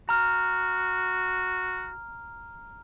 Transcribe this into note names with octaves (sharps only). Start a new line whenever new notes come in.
F#4 A#5 F6